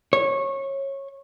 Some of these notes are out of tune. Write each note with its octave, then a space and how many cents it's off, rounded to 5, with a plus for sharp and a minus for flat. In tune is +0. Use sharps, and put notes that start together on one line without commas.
C#5 -20